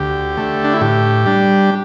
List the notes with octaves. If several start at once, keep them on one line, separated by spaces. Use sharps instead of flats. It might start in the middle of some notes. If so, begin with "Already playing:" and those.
Already playing: D2 G4
D3 A3
D4
E4
A2 G4
G3 D4